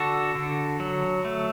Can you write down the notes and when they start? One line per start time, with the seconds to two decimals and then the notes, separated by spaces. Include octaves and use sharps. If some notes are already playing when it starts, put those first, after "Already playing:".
Already playing: D3 F#4 A4
0.35 D3
0.80 F#3
1.25 A3